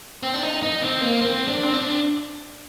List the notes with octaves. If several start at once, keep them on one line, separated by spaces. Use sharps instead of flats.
C4
D4
D#4
D#4
C4
A#3
C4
D4
C4
D4